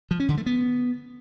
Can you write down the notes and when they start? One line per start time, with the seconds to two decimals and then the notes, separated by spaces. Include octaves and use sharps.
0.11 F3
0.20 C#4
0.29 D3
0.37 A3
0.46 B3